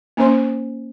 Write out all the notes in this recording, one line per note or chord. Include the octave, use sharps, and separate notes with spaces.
A#3 C#4 C5 C6